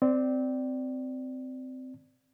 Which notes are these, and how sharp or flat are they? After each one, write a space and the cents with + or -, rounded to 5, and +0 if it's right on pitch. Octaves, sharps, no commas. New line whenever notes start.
C4 -15 D5 +0